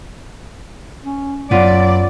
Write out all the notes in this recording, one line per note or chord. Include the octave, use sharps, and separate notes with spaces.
C#4
F#2 F#3 B3 F4 D5